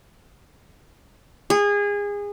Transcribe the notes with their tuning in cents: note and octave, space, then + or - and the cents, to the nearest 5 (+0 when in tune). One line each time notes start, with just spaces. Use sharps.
G#4 -25